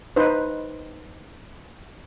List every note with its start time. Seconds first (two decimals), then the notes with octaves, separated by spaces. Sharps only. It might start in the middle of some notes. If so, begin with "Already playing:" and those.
0.16 D#4 B4 C5